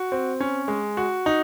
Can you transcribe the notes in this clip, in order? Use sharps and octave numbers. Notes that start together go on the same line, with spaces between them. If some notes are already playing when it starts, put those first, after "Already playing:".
Already playing: F#4
C4
C#4
G#3
F#4
D#4